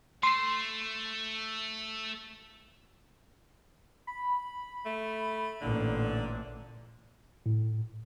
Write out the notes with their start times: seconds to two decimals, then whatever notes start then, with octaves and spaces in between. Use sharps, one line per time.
0.23 A3 C6 C7
4.07 B5
4.86 A3
5.62 A1 A#2 D3
7.46 A2